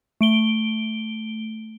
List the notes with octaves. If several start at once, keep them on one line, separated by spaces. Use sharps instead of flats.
A3 D7 G7